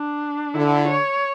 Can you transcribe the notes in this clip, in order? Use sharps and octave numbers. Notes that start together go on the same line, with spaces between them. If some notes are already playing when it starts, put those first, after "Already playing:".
Already playing: D4
D3 E4
C#5